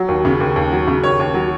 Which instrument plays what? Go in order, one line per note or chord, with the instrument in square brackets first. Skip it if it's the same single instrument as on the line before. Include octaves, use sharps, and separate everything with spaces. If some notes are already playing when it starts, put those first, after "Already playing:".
Already playing: [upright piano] F#3
D#2
C#3
D#2
D#2
F#3
C#3
D#2 C#5
D#2
F#3